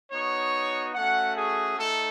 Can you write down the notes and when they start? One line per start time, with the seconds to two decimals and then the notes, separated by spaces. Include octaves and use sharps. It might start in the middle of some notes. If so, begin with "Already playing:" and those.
0.12 B3 D#4 F#4 C#5
0.95 A3 C#4 F#4 F#5
1.37 G#4
1.78 A3 D#4 A4